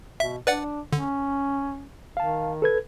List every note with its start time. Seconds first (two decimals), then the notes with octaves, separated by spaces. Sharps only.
0.20 B2 E5
0.47 D4 B4 D5 F#5
0.93 D3 C#4
2.17 D#3 F5 A5
2.62 A4 B4 G#6